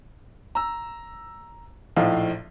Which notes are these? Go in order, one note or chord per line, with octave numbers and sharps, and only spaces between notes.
A#5 E6
A#1 A2 F3 D#4 F5